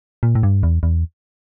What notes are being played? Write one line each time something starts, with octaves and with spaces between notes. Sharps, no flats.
A#2
A2
G2
E2
E2